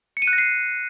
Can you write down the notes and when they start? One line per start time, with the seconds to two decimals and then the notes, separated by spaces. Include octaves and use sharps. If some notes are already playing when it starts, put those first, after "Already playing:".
0.17 C#7
0.22 D#7
0.27 F#6
0.33 A#6
0.38 C7